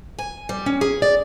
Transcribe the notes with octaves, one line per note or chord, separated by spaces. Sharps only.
G#5
G3
C#4
G#4
D5